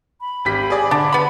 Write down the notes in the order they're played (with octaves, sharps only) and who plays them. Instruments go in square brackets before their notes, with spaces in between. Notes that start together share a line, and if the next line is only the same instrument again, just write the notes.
[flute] B5
[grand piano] G#1 G4 B6
G#4 D5
[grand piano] D3 [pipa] D4
[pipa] B3 B5